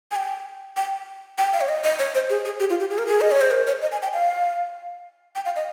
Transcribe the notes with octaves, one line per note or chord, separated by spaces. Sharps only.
G#5
G5
G5
G5
F5
C#5
D#5
D#5
C#5
C5
G#4
G#4
G4
F4
G4
G#4
A#4
G#4
D#5
C#5
C5
A#4
C#5
D#5
G#5
G5
F5
G5
F5
D#5